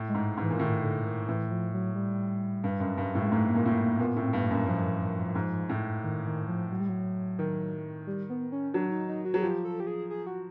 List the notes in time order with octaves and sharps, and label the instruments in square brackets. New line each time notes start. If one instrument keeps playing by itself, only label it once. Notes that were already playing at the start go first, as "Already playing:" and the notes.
Already playing: [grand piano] A2
[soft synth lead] G#3
[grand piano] G#2
G#2
[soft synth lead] E3
[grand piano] A#2
[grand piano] A2 [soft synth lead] D#3
[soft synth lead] D3
D#3
[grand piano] A2 [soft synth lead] E3
[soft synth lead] F3
F#3
G3
[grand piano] G2
F#2
G2
[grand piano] A2 [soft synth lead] G3
[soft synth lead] G#3
[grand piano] G#2 [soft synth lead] A3
[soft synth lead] A#3
[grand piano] A#2
[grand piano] A2 [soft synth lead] A#3
[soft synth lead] A#3
[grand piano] A#2 [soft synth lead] B3
[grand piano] A2
[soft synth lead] C4
[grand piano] G2 [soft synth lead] B3
[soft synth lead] A#3
[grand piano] F#2
[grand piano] G2 [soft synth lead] F3
[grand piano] G#2
A2
[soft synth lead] D#3
D#3
F3
F#3
G3
F#3
[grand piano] D#3
[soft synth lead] G3
B3
C#4
[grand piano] F#3 [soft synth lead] D4
[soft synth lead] D#4
D#4
F#4
[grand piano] F#3 [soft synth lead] G#4
[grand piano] F3 [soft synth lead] G4
[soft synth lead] A4
G4
G#4
G#4
F#4